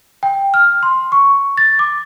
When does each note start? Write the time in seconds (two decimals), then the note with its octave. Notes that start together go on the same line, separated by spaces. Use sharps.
0.23 G5
0.54 F6
0.83 C6
1.12 C#6
1.57 A6
1.79 D6